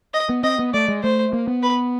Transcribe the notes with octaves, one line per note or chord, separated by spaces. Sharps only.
D#5
B3
C4 D#5
B3
A3 D5
G#3
A3 C5
A#3
B3
B4